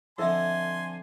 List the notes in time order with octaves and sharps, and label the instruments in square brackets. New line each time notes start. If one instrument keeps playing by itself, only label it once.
[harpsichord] F2 D3 [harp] A4 D#5 E5 [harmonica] G#5 C6